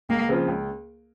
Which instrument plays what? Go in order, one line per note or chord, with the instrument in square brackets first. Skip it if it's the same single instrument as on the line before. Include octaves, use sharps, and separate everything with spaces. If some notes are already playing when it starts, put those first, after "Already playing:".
[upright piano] C#2 [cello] A#3
[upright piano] C#3 F3 C4 F4
C#2